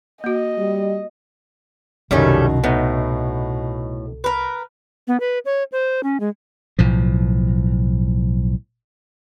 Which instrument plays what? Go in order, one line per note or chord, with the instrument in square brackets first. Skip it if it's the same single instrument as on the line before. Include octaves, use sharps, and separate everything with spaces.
[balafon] A#3 F#4 [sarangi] D#5
[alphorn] G3
[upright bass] C2 [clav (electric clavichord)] F#2 D#3 [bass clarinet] B2 [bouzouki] G3 A3 C#4
[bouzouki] A2 [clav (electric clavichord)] B3 D#4
[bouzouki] A#4 B4
[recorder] B3
B4
C#5
C5
C#4
G#3
[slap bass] B1 A2 F3